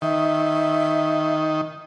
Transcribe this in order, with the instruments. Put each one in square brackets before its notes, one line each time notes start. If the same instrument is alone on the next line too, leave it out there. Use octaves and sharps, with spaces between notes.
[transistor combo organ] D#3 [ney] E5